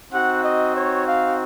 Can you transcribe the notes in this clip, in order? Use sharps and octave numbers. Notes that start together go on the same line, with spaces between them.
C4 D#4 F#4 F#5
D#5
C#5
F5